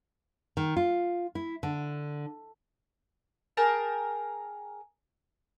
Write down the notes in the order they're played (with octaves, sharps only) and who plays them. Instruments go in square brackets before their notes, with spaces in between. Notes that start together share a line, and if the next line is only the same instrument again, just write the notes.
[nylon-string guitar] D#3
F4
E4
D3
[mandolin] G#4 A#4 G5 A5